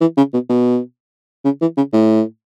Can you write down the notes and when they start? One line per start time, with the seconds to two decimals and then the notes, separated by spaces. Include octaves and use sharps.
0.01 E3
0.17 C#3
0.33 B2
0.49 B2
1.45 C#3
1.61 E3
1.77 C#3
1.93 A2